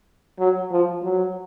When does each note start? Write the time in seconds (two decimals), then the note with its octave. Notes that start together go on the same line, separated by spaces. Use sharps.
0.39 F#3
0.71 F3
1.03 F#3